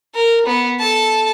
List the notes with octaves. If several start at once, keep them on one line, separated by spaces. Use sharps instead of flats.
A#4
B3
A4 A5